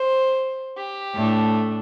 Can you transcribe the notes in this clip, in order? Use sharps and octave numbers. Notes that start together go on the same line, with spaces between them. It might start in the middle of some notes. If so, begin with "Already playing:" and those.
Already playing: C5
G4
A2 A3 D4